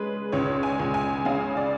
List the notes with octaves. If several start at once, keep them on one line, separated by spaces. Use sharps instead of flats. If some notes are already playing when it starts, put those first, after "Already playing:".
Already playing: C#3 G#3 B4
C#2 C#5
G#5
C#2
G#5
C#3 F5
D5